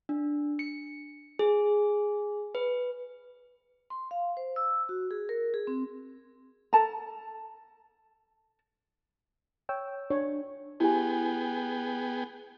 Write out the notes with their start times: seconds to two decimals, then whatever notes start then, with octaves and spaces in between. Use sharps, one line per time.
0.09 D4
0.59 C#7
1.39 G#4
2.55 B4
3.90 C6
4.11 F5
4.37 C5
4.56 E6
4.89 F#4
5.11 G#4
5.29 A#4
5.54 G#4
5.67 C4
6.73 A4 A5 A#5
9.69 C#5 G5 E6
10.10 D4 C#5
10.80 B3 E4 G4 G#4 G5 G#5